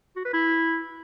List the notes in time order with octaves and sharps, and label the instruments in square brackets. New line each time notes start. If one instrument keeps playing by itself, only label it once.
[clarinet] F#4
B4
E4